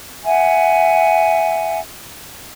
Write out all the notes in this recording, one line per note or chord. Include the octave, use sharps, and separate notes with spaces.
E5 F#5 G#5